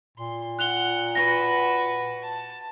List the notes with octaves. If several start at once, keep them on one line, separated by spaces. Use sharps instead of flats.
A#2 C6
F#5 F#6 F7 G7
F#4 B4 A#6
A5